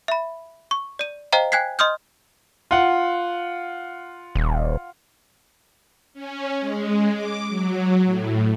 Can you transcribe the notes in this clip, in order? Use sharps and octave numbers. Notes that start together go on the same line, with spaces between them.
E5 B5
C#6
D5 D#7
C5 D#5 F5 G5 A#5
G5 G#5 F#6 G#6 B6 C7
D#5 C6 D#6 F6 G6
F4 F#5
D#1
C#4
G#3
D6
F#3
A2